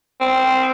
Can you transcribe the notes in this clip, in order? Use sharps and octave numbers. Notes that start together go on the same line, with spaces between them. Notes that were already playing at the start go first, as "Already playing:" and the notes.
C4